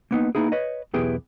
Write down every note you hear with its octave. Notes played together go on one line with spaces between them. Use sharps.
A#3 B3 D#4
A#3 B3 D#4 E4 G#4
B4 C#5 D#5
B1 E2 B3 E4 G4 G#4